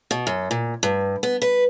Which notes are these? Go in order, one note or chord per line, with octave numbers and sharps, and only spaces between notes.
B2
F#2
A#2
G2
B3
B4